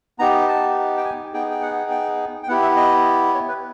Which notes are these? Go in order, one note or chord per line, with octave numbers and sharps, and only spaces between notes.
B3 D#4 G4 A#5
A5
G5
G#5
B3 D#4 G#4 G5
G5
F#5
G5
G5
B3 E4 G4 F#5
E5
D#5
C#5
B4